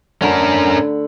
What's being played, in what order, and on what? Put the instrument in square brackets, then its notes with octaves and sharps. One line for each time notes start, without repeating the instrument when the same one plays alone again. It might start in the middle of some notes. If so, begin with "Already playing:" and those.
[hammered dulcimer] D3 A3 B5 [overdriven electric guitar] C#4 A#4